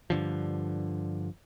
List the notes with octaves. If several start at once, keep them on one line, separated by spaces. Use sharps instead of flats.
G2 D3 F3